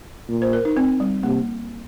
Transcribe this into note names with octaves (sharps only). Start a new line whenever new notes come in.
A#2
C5
A#4
D#4
C4
G3
C3 A#3